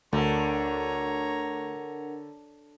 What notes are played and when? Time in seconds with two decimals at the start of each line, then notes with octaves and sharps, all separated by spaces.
0.13 D2 D3 D4 A#4 C#5 F#5 A#5